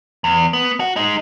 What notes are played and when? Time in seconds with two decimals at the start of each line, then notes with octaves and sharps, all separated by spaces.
0.24 E2
0.53 B3
0.80 F#4
0.96 G#3 D#4